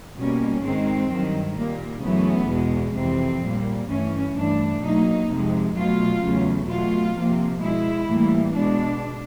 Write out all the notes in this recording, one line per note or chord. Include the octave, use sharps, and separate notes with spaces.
B2 G3 A#3 C#4
G#2 D#3 G#3 C4
G2 D#3 F#3
A#2 G3 A#3
F#2 C#3 E3 A3 B3
E2 B2 G#3
F2 C3 E3 C4
A#2 G3 A#3
G2 E3 A3 C#4
G2 E3 A3 D4
B2 F#3 A#3 D#4
F2 C3 F3 G#3
B2 F#3 A3 F4
E2 C#3 F#3 A3
B2 F#3 A3 F4
C3 F3 A#3
B2 G#3 E4
A2 E3 G3 A#3
B2 G#3 D4